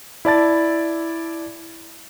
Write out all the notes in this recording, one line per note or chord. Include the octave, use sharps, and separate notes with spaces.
E4 D5 A5 A6